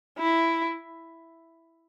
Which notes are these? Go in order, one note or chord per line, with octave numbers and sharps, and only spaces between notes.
E4